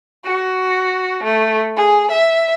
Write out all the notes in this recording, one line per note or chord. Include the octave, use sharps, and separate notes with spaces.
F#4
A3
G#4
E5